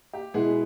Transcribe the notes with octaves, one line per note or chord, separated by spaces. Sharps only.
G4
B2 G#3 B3 E4 G#4